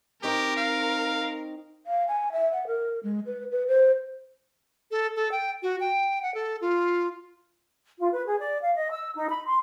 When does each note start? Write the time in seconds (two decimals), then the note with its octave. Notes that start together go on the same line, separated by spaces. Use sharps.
0.23 C4 D#4 G4 A#4 C#6
0.57 F5
1.85 F5
2.08 G#5
2.32 E5
2.53 F#5
2.67 A#4
3.03 G#3
3.26 B4
3.52 B4
3.67 C5
4.91 A4
5.16 A4
5.32 G5
5.63 F#4
5.80 G5
6.22 F#5
6.34 A4
6.61 F4
8.00 F4
8.12 B4
8.26 G#4
8.40 D5
8.61 F5
8.75 D#5
8.91 E6
9.15 D#4
9.30 B5
9.45 C6